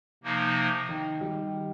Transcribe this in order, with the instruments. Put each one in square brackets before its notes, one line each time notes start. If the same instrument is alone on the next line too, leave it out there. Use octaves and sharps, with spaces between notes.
[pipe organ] C3 F3 A#3 D#4
[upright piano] D#3
D#3 G3